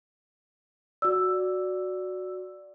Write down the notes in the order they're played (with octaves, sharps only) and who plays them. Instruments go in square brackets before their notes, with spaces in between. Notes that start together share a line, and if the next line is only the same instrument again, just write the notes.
[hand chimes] F#4 D5 [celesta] E6